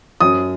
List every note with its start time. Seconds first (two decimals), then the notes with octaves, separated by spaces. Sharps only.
0.21 F#2 D#6